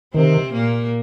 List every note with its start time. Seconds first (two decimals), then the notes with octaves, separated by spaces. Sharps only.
0.14 C3 D#3 C4
0.53 A#2 A#3